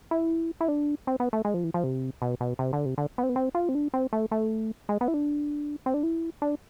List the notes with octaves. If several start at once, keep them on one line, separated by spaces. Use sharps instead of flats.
E4
E4
D4
C4
B3
A3
G#3
F3
E3
F3
C3
B2
B2
C3
D3
C3
D3
B3
C4
B3
C4
F4
C4
D4
C4
A3
A3
G#3
B3
E4
D4
C4
D4
E4
D4